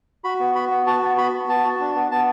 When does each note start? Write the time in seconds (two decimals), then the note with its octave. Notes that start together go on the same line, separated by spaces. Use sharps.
0.24 F#4 B5
0.40 B3
0.55 F#4 B5
0.71 B3
0.86 F#4 A5
1.02 B3
1.17 F#4 B5
1.33 B3
1.48 B3 A5
1.64 F#4
1.80 D4
1.96 B3
2.11 B3 A5